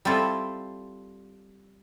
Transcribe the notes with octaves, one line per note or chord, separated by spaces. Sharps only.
G3 C4 E4 F4 A4